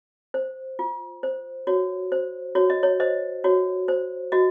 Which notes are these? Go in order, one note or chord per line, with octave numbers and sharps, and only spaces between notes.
C5
F4
C5
F#4 C#5
C5
F#4 C#5
D#5
C#5
C5 D#5
F#4 C#5
C5
F#4 D#5